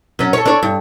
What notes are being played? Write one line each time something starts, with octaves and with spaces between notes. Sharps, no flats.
F#2 C#4
A4 C#5
D4 C#5
G2